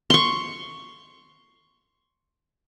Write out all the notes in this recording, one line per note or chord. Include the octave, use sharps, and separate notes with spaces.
C6 C#6